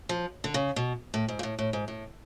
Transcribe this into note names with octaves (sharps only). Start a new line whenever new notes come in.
F3
D3
C#3
B2
A2
G#2
A#2
A2
A2
G#2
A2